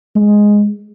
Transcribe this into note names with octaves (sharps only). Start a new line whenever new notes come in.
G#3